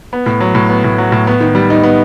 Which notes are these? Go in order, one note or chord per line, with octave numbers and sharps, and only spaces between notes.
B3
A2
F#3
A2
B3
A2
F#3
A2
B3
D#3
G3
D#4
B3